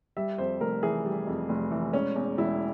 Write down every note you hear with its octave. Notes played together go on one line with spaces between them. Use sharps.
G3 E5
F2 C5
F1 A#4
E3 G#4
G3
F2
F1
E3
E1 C#4
E2
E1 E4